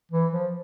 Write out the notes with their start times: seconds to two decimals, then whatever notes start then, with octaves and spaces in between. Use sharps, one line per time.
0.12 E3
0.32 F3